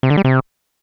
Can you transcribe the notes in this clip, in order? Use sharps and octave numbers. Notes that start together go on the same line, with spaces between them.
C3
D3
G3
C3